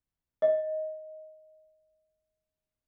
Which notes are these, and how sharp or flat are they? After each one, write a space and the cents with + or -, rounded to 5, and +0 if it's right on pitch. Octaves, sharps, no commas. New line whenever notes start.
D#5 +5